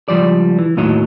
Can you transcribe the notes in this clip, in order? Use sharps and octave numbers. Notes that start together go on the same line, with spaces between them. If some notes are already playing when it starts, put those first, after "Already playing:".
C#2 F3 G3 D5
E3
D#2 A2 F#3 D#4